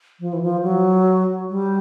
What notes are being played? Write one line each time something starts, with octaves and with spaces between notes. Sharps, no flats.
F3
E3
F3
F#3
G3